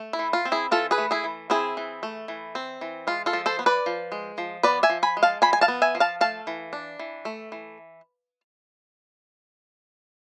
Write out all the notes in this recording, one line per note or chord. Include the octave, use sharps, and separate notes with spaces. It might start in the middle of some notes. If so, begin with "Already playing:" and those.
Already playing: A3
E4
E3
F4
C4
E4 G#4
E3 F4 A4
G#4 B4
A3
E4 G#4
E3
C4 E4 G#4
E3
A3
E3
C4
E3
G#3 F4
F4 A4
F3
A4 C5
B3
B4 D5
F3
G#3
F3
B3 B4 D5
E5 G#5
F3
G#5 B5
G#3
F5 A5
F3 G#5 B5
G#5
F5 A5
B3
E5 G#5
F3
F5 A5
A3 F5 A5
E3
D4
E3
A3
E3